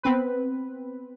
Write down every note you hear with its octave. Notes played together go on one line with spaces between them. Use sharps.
B3 C4 B4